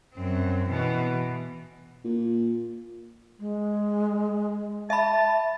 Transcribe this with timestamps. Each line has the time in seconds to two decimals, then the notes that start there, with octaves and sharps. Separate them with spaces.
0.13 F#2 C4
0.66 B2 E3
2.05 A#2
3.40 G#3
4.90 E5 A5 B5